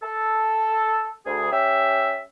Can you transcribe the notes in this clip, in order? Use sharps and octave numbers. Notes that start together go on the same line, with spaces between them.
A4
D2 G#4
C#4 G4 E5